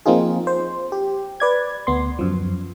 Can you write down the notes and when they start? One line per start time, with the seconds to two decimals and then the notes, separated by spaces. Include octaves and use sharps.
0.06 F3 A#3 C4 D#4 F4 G#4
0.47 C5
0.92 G4
1.40 B4 D5 G#6
1.87 D2 B3 C6
2.19 F#2 F3